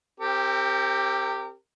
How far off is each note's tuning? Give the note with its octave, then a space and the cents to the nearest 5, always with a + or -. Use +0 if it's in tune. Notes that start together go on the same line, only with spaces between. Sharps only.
C4 +25 G4 +0 A#4 -30